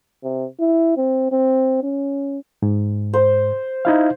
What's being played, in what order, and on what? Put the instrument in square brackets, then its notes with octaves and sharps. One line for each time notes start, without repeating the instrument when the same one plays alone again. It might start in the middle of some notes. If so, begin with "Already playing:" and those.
[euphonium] C3
E4
C4
C4
C#4
[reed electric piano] G#2
[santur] C5
[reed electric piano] D#4 E4 F5